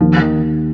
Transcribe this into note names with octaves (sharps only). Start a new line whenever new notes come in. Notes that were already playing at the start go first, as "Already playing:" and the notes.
D#2 F3
D#3